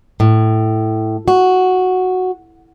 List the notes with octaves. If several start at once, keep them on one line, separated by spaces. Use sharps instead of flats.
A2
F#4